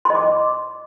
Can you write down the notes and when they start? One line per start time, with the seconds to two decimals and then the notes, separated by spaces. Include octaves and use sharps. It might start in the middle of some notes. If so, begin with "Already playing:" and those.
0.05 C6
0.10 D#5
0.15 D6